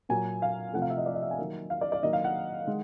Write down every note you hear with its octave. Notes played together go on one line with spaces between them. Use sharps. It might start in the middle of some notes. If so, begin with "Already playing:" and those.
A#2 F#3 A#3 G#5
F5
C3 F3 A3 F#5
F5
E5
D#5
D5
D#5
E5
G#5
D#3 F#3 A#3
F5
D5
D5
D#3 F#3 A#3 D#5
F5
F#5
D#3 G#3